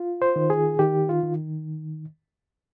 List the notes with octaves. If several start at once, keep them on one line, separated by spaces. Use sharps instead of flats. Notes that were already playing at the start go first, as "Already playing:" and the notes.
Already playing: F4
C5
D#3
G#4
D#3 G4
F4
D#3